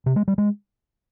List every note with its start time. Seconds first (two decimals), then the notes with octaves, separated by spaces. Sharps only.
0.06 C3
0.16 G#3
0.28 G3
0.38 G#3